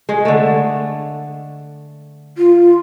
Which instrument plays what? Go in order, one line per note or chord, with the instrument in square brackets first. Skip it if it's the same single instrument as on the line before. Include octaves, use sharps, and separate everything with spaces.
[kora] G#3
D3 A3
[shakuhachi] F4